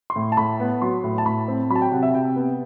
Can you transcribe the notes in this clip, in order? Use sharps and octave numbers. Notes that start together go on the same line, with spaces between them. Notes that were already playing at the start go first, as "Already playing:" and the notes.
C6
A2
A5
A2 B5
B3
F#3 C6
A2
A5
A2 B5
C4
F#3 B5
A5
G5
C3 F#5
E5
C3 G5
B3